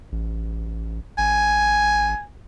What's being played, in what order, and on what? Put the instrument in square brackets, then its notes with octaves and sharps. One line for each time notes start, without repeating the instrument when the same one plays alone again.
[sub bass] A1
[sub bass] G#1 [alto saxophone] G#5